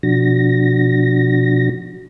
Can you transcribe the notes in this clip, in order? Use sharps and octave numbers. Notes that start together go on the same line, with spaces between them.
B2 F3 D4 F#4 A#6